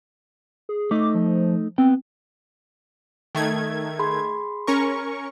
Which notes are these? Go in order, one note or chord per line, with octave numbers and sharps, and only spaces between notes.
G#4
A3 D#4 D6
F3
B3 C4 G5
D#3 A3 G#6
G#4 B5 C6
C#4 A#4 C#6